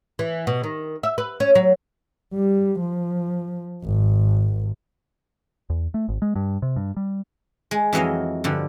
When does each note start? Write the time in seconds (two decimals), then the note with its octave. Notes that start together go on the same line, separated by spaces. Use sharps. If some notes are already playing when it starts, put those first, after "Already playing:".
0.19 E3
0.47 B2
0.64 D#3
1.03 E5
1.18 B4
1.40 C#4
1.55 F#3
2.34 G3
2.80 F3
3.84 G#1
5.70 E2
5.94 A3
6.09 G#1
6.22 G#3
6.36 G2
6.62 C3
6.76 G2
6.97 G3
7.71 G#3
7.93 F2 E3 F#3 D#5 F5
8.44 G2 D3 F3